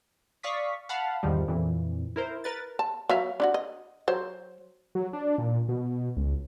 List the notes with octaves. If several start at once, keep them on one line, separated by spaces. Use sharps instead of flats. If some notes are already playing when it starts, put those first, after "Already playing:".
D5 F5 C#6 D#6 B6
F5 F#5 A5 B5
E2 G#2 D#3 F3 G3
F2 A#2 E3
E4 A#4 C5
A#4 B4 A6
A5
F#3 E5 F5
D4 E4 F#4
D#5
F#3 C5
F#3
D4
A#2
B2
C#2